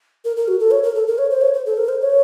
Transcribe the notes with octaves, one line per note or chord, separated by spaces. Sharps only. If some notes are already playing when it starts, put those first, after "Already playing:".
A#4
A#4
F#4
A4
C#5
A#4
A4
A#4
C#5
C5
C#5
C5
A4
A#4
C5
C#5